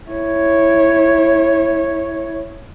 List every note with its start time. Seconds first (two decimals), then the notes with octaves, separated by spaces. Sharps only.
0.11 E4 C#5